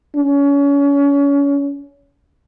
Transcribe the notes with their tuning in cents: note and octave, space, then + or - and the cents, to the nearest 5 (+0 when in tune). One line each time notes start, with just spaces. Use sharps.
C#4 +30